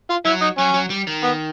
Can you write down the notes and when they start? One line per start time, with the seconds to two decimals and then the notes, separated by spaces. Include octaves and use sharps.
0.10 F4
0.25 F#3 E4
0.41 D#4
0.58 F#3 C#4
0.74 F#3
0.90 G3
1.07 D#3
1.23 B3